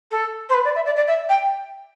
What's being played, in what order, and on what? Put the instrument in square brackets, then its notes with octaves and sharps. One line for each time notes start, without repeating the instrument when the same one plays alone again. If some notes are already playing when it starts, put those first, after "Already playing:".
[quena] A4
C5
B4
D5
E5
D5
D5
E5
G5